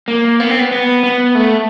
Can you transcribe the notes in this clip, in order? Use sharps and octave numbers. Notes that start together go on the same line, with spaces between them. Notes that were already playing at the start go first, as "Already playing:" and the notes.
A#3
B3
C4
B3
B3
B3
A3